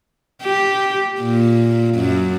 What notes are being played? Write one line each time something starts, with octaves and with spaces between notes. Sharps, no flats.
G4
A#2
F#2